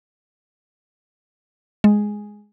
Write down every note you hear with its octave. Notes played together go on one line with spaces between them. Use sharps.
G#3